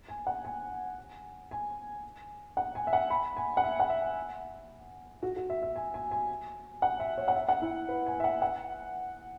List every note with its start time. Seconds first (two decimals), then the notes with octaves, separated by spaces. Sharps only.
0.09 G#5
0.27 F#5
0.45 G#5
1.51 G#5
2.57 F#5
2.75 G#5
2.87 E5
2.93 F#5
3.10 B5
3.37 G#5
3.57 F#5
3.64 E5
3.80 F#5
3.90 E5
5.23 F#4
5.36 F#4
5.50 E5
5.63 E5
5.76 G#5
5.94 G#5
6.11 G#5
6.82 F#5
7.00 E5
7.18 C#5
7.28 F#5
7.36 E5
7.48 F#5
7.62 E4
7.89 B4
8.06 G#5
8.20 E5
8.24 F#5
8.42 F#5